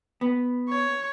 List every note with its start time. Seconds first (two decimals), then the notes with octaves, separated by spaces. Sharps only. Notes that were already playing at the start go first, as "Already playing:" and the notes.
0.21 B3
0.69 C#5